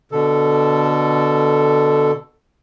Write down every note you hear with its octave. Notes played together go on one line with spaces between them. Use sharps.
B2 D3 A4